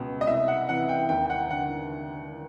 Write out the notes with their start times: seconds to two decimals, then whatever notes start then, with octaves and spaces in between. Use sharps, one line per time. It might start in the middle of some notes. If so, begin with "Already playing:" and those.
Already playing: C#2 B2
0.21 D#5
0.27 C2 E5
0.48 F#5
0.69 C3 E3 F#5
0.89 G5
1.09 D#2 G5
1.25 G5
1.30 F#5
1.50 D3 F#5